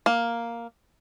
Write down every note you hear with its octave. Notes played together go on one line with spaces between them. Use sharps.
A#3